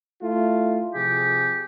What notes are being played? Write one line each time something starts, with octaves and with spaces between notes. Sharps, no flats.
A3 E4 F4
C3 F3 G4 G#4